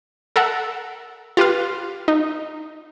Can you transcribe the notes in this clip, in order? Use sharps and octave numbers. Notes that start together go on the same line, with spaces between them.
A4 A#4 E5 F#5
F4 G4 B4 F5
D#4